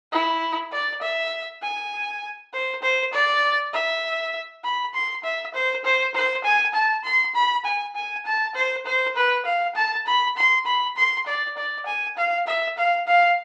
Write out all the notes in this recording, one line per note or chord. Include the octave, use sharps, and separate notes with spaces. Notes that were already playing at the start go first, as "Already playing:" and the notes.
E4
D5
E5
G#5
C5
C5
D5
E5
B5
C6
E5
C5
C5
C5
G#5
A5
C6
B5
G#5
G#5
A5
C5
C5
B4
F5
A5
B5
C6
B5
C6
D5
D5
G#5
F5
E5
F5
F5